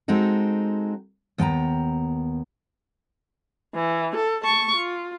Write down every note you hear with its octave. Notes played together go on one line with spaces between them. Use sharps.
G#3 C4 D#4 F#4 A4
D#2 B3 G5 A5 A#5
E3
A4
A5 C#6
F4